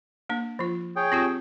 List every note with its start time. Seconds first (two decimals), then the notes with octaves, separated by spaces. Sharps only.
0.29 A#3 D4
0.59 F3 F4
0.96 G#4 C#5 G5
1.12 C4 F4 G4